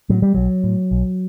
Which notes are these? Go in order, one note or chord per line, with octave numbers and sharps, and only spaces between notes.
A2 F#3
G3
B1 F#3
A2
B1